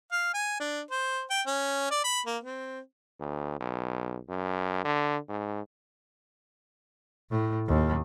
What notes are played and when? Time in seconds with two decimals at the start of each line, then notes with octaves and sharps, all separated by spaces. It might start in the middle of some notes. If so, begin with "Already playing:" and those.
0.12 F5
0.34 G#5
0.60 D4
0.91 C5
1.30 G5
1.47 C#4
1.91 D5
2.04 B5
2.26 A#3
2.43 C4
3.20 D2
3.60 B1
4.29 F#2
4.85 D3
5.29 G#2
7.31 A2
7.67 D#2